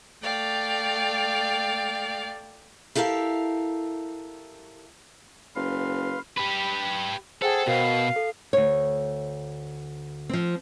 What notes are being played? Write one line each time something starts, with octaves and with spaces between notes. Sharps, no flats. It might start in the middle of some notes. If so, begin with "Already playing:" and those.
A3 D5 F5 G5
E4 G4 A4 A#4 F5
F#1 B4 F5 C6
G4 B4 B5
G#4 A4 C5 F#5 G5
B2 F#4 A#4 F5
A4
D2 C#5
F3 C4